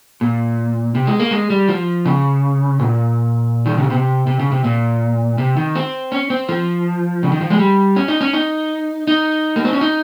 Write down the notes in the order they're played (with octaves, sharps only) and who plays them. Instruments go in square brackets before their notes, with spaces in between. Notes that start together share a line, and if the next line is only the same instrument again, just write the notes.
[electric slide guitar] A#2
C3
G#3
A#3
G#3
G3
F3
C#3
A#2
D#3
C#3
C3
C3
C#3
C3
A#2
C3
D#3
C4
C#4
C4
F3
C#3
D#3
F3
G#3
G3
C#4
D#4
C#4
D#4
D#4
A#3
C4
C#4
D#4